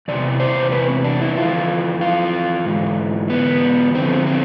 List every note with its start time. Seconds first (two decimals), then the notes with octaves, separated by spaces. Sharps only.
0.08 E2 C3 E3 D5
0.40 C5
0.72 B4
0.88 C4
1.05 D4
1.21 E4
1.36 F2 E3 F4
2.01 F4
2.66 G#2 E3
3.30 B3
3.94 F2 D3 C4
4.27 C4